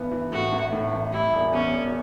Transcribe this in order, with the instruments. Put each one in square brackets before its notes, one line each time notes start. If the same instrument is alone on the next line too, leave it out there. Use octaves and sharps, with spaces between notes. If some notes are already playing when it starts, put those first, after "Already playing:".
Already playing: [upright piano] G2 E3 B3
E3
[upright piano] A2 [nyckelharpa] F#4
[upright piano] A1
A2
A1
[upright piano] G3 [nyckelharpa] E4
[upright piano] E1
[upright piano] E2 [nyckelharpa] C#4
[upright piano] E1